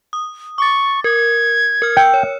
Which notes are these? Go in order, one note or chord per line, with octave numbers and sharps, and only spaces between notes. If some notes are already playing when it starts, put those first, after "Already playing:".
D#6
C#6 D6 A6
A#4 G#6
A#4 F6
G5 E6 C#7
C#5